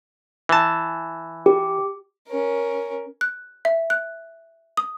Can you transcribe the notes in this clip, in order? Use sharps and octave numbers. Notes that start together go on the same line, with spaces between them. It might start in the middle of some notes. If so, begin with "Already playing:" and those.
E3 A5
G4
C#4 A#4
F#6
E5
F#6
D#6